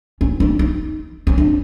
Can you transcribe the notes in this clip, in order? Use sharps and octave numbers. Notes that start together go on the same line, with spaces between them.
C#4
D4
D#4
C#4
D4